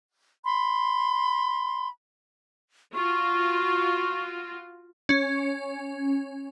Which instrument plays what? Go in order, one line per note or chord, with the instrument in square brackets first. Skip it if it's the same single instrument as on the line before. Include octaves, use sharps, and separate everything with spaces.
[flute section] B5 C6
[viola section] F4 F#4 [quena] C#6
[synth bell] C#4